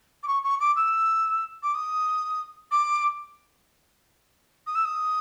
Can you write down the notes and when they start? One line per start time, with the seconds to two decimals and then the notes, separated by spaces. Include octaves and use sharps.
0.23 D6
0.27 C#6
0.43 C#6
0.60 D6
0.76 E6
1.62 D6
1.74 D#6
2.71 D6
4.66 D#6
4.75 E6
4.84 D#6